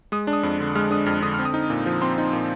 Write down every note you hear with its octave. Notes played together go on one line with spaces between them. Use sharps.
G#3 D#6
D4
D#6
F2
D3
G#3 F6
D4 D#6
F2 F6
D3 D#6
F6
C4
D#6
D#4
A#2
F3
C4 C6
D#4
A#2